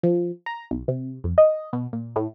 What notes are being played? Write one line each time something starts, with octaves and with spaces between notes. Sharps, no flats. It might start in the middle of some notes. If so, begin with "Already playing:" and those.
F3
A#5
B1
C3
F2
D#5
B2
A#2
A2